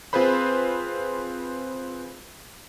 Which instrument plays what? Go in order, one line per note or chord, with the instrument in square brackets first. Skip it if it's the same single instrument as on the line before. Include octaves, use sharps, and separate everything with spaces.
[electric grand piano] C4 F4 G#4 B4 C5 B5